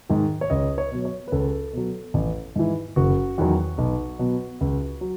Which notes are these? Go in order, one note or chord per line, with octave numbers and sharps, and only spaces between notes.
G#2 D#3
C#5
C#2 D#5
C#5
B2 F#3
C#5
B4
C#2 A4
B2 F#3
A1
G#2 E3
F#1 F#4
E2 D#3 F#3
B1
B2 F#3
C#2
F#3